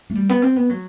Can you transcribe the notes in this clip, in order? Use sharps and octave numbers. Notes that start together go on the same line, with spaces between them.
A3
G3
B3
C4
B3
F#3